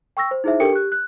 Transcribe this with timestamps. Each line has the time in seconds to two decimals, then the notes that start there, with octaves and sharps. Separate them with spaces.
0.17 G5 C#6 E6 A#6
0.31 C5
0.44 D#4 E4 G#4 C5 E5
0.60 D4 G4 A4 A#4 G5 C#7
0.73 G4 F#6
0.92 F#6